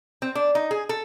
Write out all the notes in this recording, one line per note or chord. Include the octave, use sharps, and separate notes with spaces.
C4
D4
D#4
G#4
A4